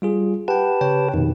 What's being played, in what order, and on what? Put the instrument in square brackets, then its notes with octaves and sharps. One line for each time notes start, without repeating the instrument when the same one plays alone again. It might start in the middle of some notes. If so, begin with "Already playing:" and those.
[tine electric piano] G3 F4 G#4
[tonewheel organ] G4 B4 A5 [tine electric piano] F#5 G5
[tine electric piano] C#3 C#5 G5
[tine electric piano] F2 B2 [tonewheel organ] D#3